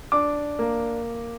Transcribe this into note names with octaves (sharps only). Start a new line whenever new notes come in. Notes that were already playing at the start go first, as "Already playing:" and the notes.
D4 D6
A#3